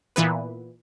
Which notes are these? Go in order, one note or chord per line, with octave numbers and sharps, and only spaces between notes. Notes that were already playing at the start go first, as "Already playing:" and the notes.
A#2 E3 B3 B4